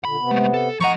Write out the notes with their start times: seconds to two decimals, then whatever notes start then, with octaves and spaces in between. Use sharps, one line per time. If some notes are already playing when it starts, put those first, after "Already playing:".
0.05 A#2 D3 B5
0.20 C3 B3
0.31 G#3 A3
0.54 A4
0.80 F3 D#5 F#5 A#5 C#6